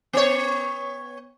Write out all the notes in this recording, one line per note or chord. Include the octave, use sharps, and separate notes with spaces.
B3 C#5